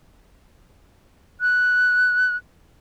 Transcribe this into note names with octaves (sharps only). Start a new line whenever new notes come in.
F#6